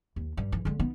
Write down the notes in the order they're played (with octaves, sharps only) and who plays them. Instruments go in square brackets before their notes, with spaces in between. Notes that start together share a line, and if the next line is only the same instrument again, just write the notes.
[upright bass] D#2
G2
E3
D3 G#3
B3 D#4